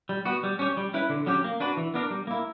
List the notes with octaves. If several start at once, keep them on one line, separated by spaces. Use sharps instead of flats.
G3
B3 F#4
G3
C#4 G4 C#5
G3
C#4 E4 B4
D3
F#3 C#4 G4
A#3
D4 F#4 B4
E3
B3 D4 A#4
G3
A#3 E4